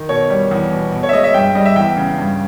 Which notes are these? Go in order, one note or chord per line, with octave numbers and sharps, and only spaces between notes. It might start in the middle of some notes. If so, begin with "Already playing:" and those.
Already playing: D#3
B2 C#5
G3
E2
B2
B2
C#5
E5
G#3 D#5
E5
G2 G5
G3 D#5
E5
E2 G5
C#3
G2